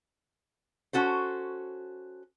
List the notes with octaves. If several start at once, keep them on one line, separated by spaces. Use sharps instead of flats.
C#4 F#4 A4 C5